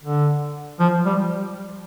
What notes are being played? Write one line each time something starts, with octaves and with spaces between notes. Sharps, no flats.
D3
F3
G3